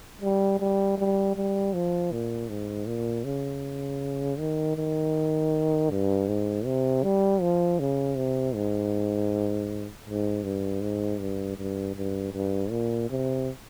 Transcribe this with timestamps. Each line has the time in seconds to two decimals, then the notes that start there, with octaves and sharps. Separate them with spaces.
0.22 G3
0.60 G3
0.98 G3
1.36 G3
1.73 F3
2.12 A#2
2.49 G#2
2.87 A#2
3.24 C#3
4.38 D#3
4.76 D#3
5.90 G2
6.28 G#2
6.65 C3
7.03 G3
7.41 F3
7.79 C#3
8.17 C3
8.55 G#2
10.06 G#2
10.44 G2
10.81 G#2
11.20 G2
11.58 G2
11.96 G2
12.33 G2
12.71 A#2
13.10 C3